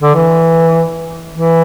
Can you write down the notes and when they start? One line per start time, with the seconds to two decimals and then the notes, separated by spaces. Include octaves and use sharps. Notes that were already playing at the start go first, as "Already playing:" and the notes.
0.02 D3
0.14 E3
1.33 E3